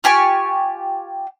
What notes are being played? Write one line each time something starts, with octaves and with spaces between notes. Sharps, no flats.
F4 G4 G#5 C#6